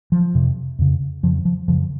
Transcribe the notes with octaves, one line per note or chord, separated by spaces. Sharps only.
F3
F2 C3
F2 C#3
F2 C#3 F3
F3
F#2 C#3 F3